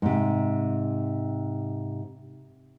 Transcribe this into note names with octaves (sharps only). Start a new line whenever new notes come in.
G#2 C3